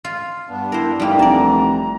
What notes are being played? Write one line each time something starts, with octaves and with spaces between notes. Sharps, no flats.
F4
G2 B3 D4
E4 A#4 C5
D3 E3 G3 A#3 D#4
F1 D5 A5 A#5